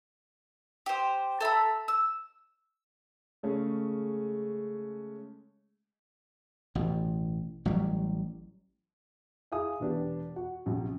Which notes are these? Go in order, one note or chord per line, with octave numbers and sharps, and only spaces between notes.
G4 C5
A4 E5 A#5 B5
E6
C#3 G#3 A3 C#4 G#4
A1 B2
A1 F#3 G3
E4 G#4 F5 G#5 D#6
E1 B3 D4 G4
F#4 F#5
A#1 F#2 C3